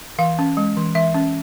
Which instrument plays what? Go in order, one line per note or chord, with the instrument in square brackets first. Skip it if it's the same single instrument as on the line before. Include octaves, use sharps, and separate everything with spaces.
[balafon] E3 F5
C#4
G#3
E3
E3 E5
C#4